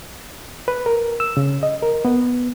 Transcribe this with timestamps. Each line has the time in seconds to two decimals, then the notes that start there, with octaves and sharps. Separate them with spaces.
0.68 B4
0.86 A#4
1.20 E6
1.37 C#3
1.63 D#5
1.83 A#4
2.05 B3